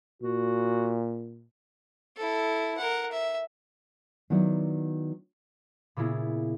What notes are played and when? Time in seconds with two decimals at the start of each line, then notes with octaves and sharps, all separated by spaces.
0.22 A#2 F#4
2.17 E4 A4
2.78 A#4 F#5
3.12 E5
4.30 D#3 F#3 B3 E4 D5
5.96 A#2 C#3 B3 E4 G#4